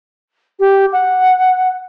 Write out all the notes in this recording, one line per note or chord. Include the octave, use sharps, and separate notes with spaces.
G4
F#5